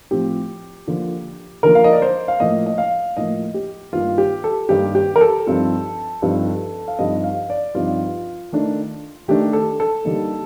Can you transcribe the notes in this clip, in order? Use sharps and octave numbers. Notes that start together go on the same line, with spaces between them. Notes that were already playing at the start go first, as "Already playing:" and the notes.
A2 F3 C4 G4
D3 F3 A#3
D3 F3 A#3 A#4
F5
D#5
D5
C5
F5
A2 F3 A#3 D#5
D#5
F5
A2 F3 A#3 D#5
G4
G2 D#3 A#3 D#4 F4
G4
A4
G2 D#3 A#3 D#4 G4
G4
A#4
A4
G2 F3 C4 D#4
G2 F3 C4 D#4
F5
G2 F3 C4 D#4 D#5
F5
D5
G2 F3 C4 D#4 F4
D#3 A3 D4
D#3 A3 D4 G4
A4
A4
D3 G3 A#3 D#4